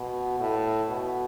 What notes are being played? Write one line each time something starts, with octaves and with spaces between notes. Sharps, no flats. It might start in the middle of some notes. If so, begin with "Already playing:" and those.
Already playing: B2
A2
B2